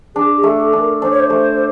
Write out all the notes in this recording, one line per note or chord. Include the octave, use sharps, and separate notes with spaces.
D4 G#4
G#4
A3
A4
D4
A#4
D4 C5
C#5
C5
A3